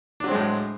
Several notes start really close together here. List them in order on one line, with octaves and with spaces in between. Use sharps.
D4 F#3 C4 G#3 A2